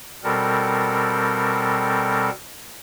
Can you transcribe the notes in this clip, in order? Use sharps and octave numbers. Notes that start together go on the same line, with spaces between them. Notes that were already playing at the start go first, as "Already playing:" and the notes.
B2 G3 C4 A4 A#4